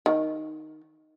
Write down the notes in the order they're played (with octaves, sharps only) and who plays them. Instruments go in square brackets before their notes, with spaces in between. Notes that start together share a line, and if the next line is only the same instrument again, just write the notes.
[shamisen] D#3